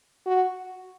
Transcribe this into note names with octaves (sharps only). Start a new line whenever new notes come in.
F#4